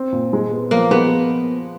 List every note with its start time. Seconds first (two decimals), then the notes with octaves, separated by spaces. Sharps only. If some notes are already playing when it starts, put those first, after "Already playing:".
Already playing: C4
0.12 A#2
0.33 G#3
0.51 B3
0.71 F3 A#3
0.91 G#3 B3